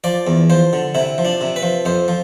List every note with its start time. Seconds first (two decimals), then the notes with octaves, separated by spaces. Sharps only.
0.04 F3 D5
0.27 E2
0.50 F3 C5
0.73 D3
0.95 C3 E4
1.18 F3
1.25 D4
1.41 C3
1.56 B4
1.63 F3
1.85 F2 C5
2.08 F3